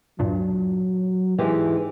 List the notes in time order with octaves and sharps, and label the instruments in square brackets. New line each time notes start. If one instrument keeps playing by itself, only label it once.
[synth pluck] D2 G2 A#2 [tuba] F#3
[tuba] G#2 [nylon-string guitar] E3 G#3 G4